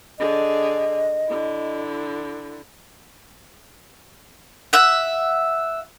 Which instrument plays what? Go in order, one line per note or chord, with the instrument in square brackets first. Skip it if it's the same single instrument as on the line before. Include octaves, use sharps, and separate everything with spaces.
[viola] D3 G#4 [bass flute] D#5
[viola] D3 E4
[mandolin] E5 F#5